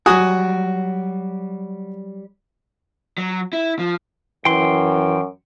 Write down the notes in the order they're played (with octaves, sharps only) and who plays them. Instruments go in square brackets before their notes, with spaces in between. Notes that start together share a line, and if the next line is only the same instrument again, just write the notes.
[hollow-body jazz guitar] F#3 G3 A#5 [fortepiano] F#4 G#5 D#6
[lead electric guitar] F#3
E4
F3
[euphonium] F#2 [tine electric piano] E3 [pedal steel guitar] G5 C6